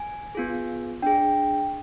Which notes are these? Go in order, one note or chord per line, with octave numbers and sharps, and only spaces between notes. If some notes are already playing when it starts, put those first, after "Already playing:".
Already playing: G#5
B3 F4 G#4
D4 G#4 G5